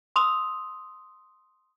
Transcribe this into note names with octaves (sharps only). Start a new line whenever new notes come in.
C6 D#6 E6 F7